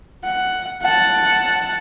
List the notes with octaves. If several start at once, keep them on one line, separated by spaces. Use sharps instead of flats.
F#5
F#5 A5